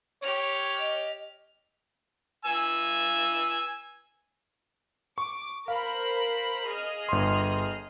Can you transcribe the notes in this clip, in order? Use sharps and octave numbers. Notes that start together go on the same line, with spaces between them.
G4 C#5 F6
D#5
G#5 E6
C#6 D6
A#4 C5 F5 B5
G#4 D#5 F6
G1 C6